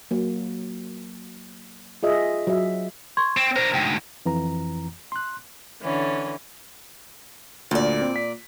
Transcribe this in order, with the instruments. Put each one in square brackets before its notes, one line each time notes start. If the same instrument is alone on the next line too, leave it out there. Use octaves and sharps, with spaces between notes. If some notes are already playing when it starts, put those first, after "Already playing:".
[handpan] F#3 A#3
F4 G#4 D#5 E5
F#3 E5
[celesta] C6 C#6 G#6
[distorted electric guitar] C4
[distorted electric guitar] D4 A#4 [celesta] C5
[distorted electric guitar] D2 G#2 [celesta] G5
[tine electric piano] F2 E3 A#5
C6 F#6
[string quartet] D3 E3 C#4
[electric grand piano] D2 [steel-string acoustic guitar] A#2 D5
[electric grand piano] C4
B6